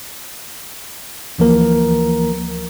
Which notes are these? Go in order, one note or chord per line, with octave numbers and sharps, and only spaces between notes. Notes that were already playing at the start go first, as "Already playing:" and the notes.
D2 E3 F3 A#3 A#4 A#5